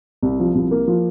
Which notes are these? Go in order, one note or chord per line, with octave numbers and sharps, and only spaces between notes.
C2
F3
C2
A#3
F3